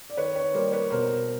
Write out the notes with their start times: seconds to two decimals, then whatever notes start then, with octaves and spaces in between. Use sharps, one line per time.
0.10 D5
0.17 D#3 B4 C#5
0.36 B4 C#5
0.54 G3 A#3 A#4 C5
0.72 B4 C#5
0.91 B2 A#4 C5